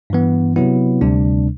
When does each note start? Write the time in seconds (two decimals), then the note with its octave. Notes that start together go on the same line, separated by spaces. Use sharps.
0.10 G2 E3 B3
0.56 C3 F#3 B3 E4
1.01 D2 C3 G3 D4